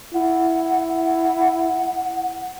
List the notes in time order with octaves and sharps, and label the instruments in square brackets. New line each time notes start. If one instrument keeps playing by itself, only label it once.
[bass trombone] E4 [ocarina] F#5